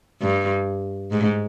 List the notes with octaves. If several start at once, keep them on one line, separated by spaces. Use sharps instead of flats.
G2
G#2